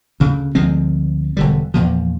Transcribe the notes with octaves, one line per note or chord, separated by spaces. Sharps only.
D2 C#3
D2 F3 G#3 C4
E1 D3 G3
E2 A#2 F3